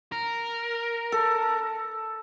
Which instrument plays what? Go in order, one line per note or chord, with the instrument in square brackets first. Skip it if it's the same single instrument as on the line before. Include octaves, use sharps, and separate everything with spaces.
[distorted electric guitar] A#4
[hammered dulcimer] A4